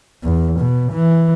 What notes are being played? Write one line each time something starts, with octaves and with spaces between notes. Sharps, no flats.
E2
B2
E3